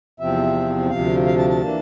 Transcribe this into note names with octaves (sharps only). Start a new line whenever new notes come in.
E2 C3 F3 C4 E5
D2 C3 F3 F5
F5
A5
A5
E3 A#3 D4